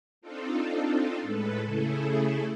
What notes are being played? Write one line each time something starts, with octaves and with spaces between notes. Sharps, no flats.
C4 D4 D#4 F4 A4
A2 G#3 A4 B4
C#3 A3 E4 G#4 A4